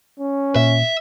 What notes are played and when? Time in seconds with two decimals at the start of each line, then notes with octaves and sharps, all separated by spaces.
0.19 C#4
0.56 A#2 E5